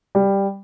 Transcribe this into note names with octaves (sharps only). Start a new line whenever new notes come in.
G3